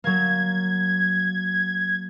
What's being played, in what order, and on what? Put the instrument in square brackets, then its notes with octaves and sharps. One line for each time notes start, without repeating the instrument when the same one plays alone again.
[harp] F#3 A#3 [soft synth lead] G#6